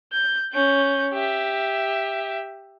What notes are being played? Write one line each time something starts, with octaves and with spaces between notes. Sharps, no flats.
G6
C#4 G6
G4 E5